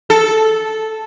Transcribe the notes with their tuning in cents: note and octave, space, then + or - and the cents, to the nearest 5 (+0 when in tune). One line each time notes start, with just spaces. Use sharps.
A4 -10